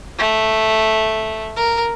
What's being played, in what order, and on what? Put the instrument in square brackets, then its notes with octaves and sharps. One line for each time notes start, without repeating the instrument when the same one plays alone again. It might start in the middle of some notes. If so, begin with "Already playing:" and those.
[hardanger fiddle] A3
A#4